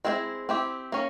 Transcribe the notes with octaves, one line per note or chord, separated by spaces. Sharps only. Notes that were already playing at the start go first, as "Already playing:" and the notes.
G#3 C4 E4 A4 C5
C4 E4 G4
A#3 C#4